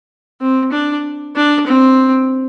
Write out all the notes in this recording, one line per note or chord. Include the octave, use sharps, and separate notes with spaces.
C4
D4
D4
C4